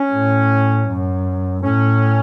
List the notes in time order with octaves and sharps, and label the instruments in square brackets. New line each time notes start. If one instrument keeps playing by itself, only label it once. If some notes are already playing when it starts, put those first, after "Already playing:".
Already playing: [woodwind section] C#4
[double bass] A2
F#2
[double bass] A2 [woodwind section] C#4